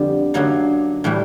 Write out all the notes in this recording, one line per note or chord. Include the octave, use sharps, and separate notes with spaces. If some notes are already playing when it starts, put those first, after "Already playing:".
Already playing: F2 D3 G3 B3
F#2 D3 F#3 A#3 D#4
A2 E3 G3